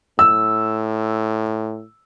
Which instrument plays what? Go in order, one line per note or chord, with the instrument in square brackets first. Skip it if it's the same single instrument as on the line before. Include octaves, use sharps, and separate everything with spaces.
[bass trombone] A2 [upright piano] E6